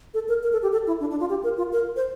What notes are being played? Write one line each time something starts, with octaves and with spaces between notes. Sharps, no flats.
A4
A#4
A#4
A4
G4
A4
E4
D4
D4
F4
G4
A#4
F4
A#4
C5